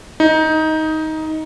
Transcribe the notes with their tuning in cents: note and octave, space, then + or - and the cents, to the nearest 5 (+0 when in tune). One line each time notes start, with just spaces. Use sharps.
D#4 +15